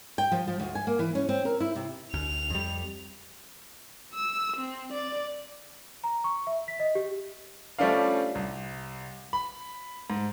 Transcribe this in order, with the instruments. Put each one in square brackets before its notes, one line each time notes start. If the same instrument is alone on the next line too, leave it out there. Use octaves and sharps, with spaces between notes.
[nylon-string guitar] G5
F3
F3
D2
G#5
A#3
E3
C#4
C4
A#4
E4
C3
[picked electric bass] D2 [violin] F7
[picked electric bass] F2 G3
[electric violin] E6
C4
D5
[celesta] A#5
C#6
E5
B6
D#5
G4
[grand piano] F3 G3 A3 C#4 D4 F5
C2
B5
G#2